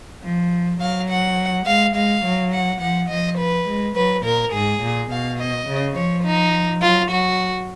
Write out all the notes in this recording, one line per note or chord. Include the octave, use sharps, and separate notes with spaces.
F3
F#3 F5
F#5
G#3 F5
G#3 F5
F#3
F#5
F3 F#5
F3 D#5
B4
G#3
F#3 B4
A#2 A#4
G#2 G#4
A#2
B2 F5
D#5
C#3
F3 C#5
D#4
F#3 F4
F#3 F#4